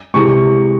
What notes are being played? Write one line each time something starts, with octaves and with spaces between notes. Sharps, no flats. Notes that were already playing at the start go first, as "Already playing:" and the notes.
C3 E3 G#3 C#6